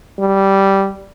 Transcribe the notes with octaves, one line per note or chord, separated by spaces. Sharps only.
G3